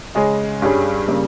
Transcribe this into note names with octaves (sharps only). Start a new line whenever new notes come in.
C#3 G#3 C#4 G#4 D#5
G2 G3 C#4 G#4
C#3 G3 A#3